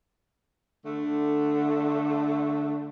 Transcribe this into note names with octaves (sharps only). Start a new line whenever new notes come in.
D3 A3